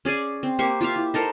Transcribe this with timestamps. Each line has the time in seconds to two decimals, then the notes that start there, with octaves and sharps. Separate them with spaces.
0.05 C#4 G#4 D5 G#5
0.43 C4
0.59 A#3 G4 C5 C#6
0.81 F4 G4 E5 F5
0.96 E4
1.14 D#4 A4 A#4 C5